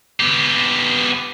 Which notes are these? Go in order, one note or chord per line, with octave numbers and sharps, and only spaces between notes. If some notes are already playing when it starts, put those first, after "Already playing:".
B3 G4